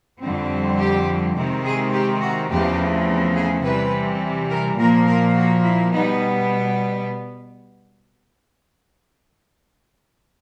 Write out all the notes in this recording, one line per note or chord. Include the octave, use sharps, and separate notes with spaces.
F2 D3 G3 C4
G4
C3 D#3 G#3 C4
G#4
G4
F#4
E2 C#3 F3 A3 C4 G4
G#4
C3 E3 G3 B4
A#4
A#2 F3 A#3 A#4
A#4
F#4
E4
B2 G3 B3 D#4